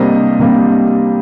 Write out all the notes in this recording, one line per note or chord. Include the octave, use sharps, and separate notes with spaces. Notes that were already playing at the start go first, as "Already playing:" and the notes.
Already playing: C3 G3 A#3 D4 C5 D#5
C3 G3 A#3 D4